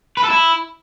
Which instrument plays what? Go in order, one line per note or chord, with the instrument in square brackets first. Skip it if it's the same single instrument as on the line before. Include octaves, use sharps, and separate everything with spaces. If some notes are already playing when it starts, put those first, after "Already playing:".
[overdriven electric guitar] B4
A4
E4